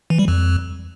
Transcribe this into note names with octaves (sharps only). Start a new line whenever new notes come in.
E3
G3
F2